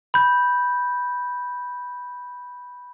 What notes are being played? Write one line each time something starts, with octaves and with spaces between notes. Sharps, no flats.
B5 G6